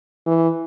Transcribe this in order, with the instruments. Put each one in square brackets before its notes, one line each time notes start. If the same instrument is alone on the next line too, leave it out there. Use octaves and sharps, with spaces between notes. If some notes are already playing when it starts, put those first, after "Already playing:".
[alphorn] E3